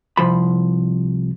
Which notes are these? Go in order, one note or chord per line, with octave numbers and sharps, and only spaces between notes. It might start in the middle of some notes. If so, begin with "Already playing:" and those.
C2 F3 B5